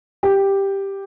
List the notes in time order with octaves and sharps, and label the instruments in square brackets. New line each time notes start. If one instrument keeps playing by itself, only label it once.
[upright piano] G4